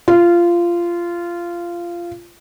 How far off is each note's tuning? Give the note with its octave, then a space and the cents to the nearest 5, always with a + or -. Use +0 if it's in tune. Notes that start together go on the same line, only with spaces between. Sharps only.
F4 -15